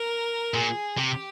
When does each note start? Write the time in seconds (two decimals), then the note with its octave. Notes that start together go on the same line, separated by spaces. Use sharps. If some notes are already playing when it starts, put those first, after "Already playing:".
Already playing: A#4
0.54 A#2 G#4
0.98 C3 G4